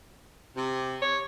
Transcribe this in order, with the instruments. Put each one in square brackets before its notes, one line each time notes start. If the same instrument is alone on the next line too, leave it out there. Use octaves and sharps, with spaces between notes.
[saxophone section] C3
[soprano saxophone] C#5